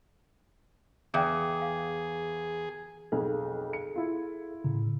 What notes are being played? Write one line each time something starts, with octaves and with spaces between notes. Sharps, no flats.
E2 G#4 E5 F5 G5
F5
B1 F2 G#4 A4
C#7
E4 F4
A2 C#3